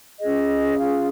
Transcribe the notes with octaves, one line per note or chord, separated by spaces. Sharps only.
C#4 F4 G#4 D#5
F4 F5